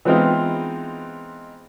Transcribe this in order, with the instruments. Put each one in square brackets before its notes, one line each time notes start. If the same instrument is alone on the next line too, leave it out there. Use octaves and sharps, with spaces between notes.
[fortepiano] E3 G#3 B3 C4 D#4 F4